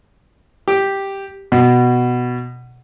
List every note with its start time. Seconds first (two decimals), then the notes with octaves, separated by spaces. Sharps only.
0.68 G4
1.52 B2